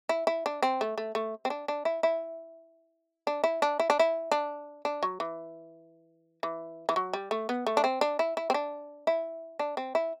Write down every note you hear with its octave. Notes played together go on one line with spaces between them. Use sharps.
E4
E4
D4
C4
A3
A3
A3
C4
D4
D4
E4
E4
D4
E4
D4
E4
D4
E4
D4
D4
F#3
E3
E3
E3
F#3
G3
A3
B3
A3
D4
C4
D4
E4
E4
C4
D4
E4
D4
C4
E4